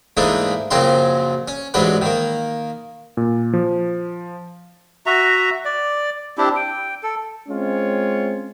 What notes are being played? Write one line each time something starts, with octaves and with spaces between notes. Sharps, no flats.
G#2 E3 A3 A#3 D4 D#4
A#1 F#2 C#3 C4 A#5 C6
C#4
A1 G#2 F#3 D4 B4
D#3 A#3
A#2
F3
F#4 E5 A#5
D5
C4 D4 E4 G4
G5
A4
G#3 C4 C#4 F4 C#5